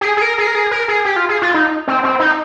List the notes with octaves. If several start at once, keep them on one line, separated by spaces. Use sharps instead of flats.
G4
G#4
G#4
A#4
G#4
A#4
G#4
A#4
G#4
G4
F4
G#4
F4
D#4
C4
C4
D#4